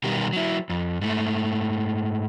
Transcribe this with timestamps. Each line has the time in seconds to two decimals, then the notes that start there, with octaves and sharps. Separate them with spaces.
0.04 B2 D#3 G3 B3 G4 A#4
0.33 F#3 E4
0.70 F2
1.01 G#2 A3